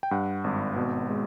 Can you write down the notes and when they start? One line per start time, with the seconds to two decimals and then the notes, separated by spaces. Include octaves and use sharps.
0.03 G5
0.11 G2 F#5
0.44 G#1
0.76 B2
1.09 G#3